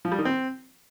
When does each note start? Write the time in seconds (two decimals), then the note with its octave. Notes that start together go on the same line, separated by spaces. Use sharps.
0.05 F3
0.12 G3
0.19 D#3
0.25 C4